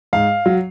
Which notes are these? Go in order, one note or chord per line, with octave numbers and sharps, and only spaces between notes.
G#2 F5
F#3